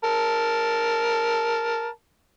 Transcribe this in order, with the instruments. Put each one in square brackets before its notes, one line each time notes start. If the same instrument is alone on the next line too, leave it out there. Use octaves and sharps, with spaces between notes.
[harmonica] A#4 A5